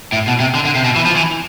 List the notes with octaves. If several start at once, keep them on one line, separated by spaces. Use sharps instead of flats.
A2
B2
C3
D3
D3
C3
B2
E3
F3
E3